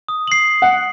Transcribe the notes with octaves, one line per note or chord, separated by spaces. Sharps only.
D#6
C7 F#7
F#5